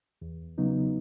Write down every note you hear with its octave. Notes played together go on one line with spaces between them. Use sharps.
E2
C#3 F#3 B3 D#4